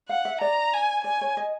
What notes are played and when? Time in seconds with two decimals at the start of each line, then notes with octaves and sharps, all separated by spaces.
0.08 F5 F#5
0.25 E5
0.41 D5 A#5
0.73 G#5
1.04 D5 G#5
1.21 C#5
1.37 D#5